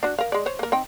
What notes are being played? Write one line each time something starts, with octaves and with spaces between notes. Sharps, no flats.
D4 F#4
A#4 F5
G#3 D5
C5 C#5
A#3 A#4
C4 D#4 G5